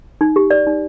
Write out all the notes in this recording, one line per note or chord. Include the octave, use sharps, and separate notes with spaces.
D#4
G4
D5
D#4